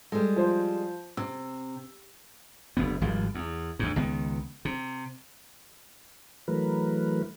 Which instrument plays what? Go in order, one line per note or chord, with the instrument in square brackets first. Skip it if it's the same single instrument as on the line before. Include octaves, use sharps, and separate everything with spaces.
[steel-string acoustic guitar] G3 G#3 [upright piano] A4
[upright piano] F3 C5
[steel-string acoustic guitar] C3 [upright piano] E6
[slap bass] F#1 D2 B3
G#1 F3 G3
E2
D2 G#2
C#2 D#3 B3
C3
[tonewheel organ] E3 F#3 A3 A#4 B4